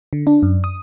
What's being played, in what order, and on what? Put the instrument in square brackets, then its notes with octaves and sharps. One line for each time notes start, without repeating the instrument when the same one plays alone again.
[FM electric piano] D3
D4
F#2
D#6